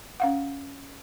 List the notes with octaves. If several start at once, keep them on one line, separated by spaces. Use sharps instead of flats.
C#4 F5 F#5